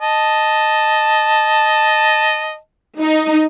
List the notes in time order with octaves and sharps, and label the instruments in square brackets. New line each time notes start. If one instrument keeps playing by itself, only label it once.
[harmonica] D#5 A5
[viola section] D#4